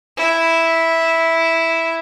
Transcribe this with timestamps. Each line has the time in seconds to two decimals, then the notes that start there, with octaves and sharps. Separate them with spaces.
0.17 E4